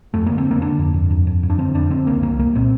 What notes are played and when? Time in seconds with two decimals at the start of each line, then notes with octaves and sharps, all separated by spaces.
0.14 F2 A3
0.26 D3 A#3
0.38 C4
0.46 D3 A#3
0.62 D3 D4
0.79 F2
0.94 F2
1.10 F2
1.27 F2
1.43 F2
1.50 D4
1.58 D3 C4
1.75 F2 D4
1.90 D3 C4
2.07 C2 A#3
2.23 C2 A#3
2.39 C2 A#3
2.55 A#2 C4